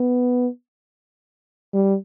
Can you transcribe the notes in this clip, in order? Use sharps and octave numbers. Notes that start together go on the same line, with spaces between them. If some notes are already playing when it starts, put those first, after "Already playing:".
Already playing: B3
G3